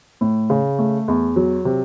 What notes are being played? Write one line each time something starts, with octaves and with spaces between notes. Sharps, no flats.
A2
C#3
A3
E2
F#3
C3